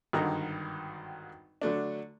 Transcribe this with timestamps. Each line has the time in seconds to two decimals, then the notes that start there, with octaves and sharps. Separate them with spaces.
0.13 G#1 G2 D3 D#3 F#5 A#5
1.62 D3 F#3 A3 D4